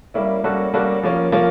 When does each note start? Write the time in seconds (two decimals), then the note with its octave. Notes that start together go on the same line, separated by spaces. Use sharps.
0.14 G3 A#3 C#4 E4
0.44 G3 A#3 C#4 F#4 A4
0.74 G3 A#3 C#4 F#4 A4
1.03 F3 A#3 C#4
1.32 F3 A#3 C#4